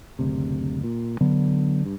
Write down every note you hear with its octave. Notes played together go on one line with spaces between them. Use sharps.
F#1 D2 C3
A#2
D3 F#3 B3
G2